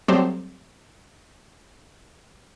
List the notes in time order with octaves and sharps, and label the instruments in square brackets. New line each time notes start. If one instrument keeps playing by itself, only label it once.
[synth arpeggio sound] F#3 G3 A3 C4 G4 C5